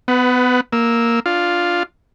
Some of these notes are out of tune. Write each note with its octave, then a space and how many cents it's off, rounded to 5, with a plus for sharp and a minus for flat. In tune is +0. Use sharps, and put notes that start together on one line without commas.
B3 +25 B4 +0 F#5 +0
A#3 +0 E6 -15
D4 +0 F4 +0